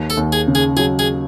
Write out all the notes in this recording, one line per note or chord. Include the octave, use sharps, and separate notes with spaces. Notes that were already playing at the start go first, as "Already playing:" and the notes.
Already playing: D#2
A4
D#2
G#4
C#3
G#4
F#3 G#4
G#4